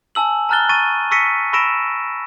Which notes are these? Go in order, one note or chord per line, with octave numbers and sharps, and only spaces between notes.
G#5 A5 E6 F#7
A5 A#5 F6 F#6 A6 G7
C#6 A6 D#7
C#6 E6 A#6 B6 C#7 D#7
B5 C#6 E6 A#6 D7 E7